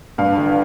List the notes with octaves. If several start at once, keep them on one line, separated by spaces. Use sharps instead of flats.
G2 F5
G1